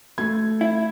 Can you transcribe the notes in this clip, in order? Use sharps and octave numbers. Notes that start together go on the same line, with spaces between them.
A3 G#6
E4